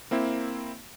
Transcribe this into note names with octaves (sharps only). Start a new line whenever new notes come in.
A#3 C4 E4